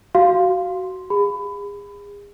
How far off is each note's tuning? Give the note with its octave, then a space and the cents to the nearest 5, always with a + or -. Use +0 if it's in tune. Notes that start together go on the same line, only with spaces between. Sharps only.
F#4 +15 F5 +0 C6 +0
G#4 -35 B5 +25